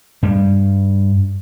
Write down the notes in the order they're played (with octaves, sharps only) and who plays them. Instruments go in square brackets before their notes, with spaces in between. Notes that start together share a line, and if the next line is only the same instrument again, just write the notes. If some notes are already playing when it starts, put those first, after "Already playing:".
[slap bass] G2 G3